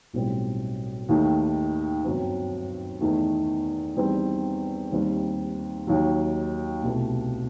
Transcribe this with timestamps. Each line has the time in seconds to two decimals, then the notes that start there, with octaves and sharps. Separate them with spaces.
0.13 B1 A2 G3 C4
1.09 D#2 D#3 A3
2.05 G1 F#2 F#3 C4
3.01 E2 D#3 A3
3.96 E2 D#3 G3 C4
4.91 D#2 D#3 G3 C4 D#4
5.87 D#2 D#3 F#3
6.83 C2 B2 A3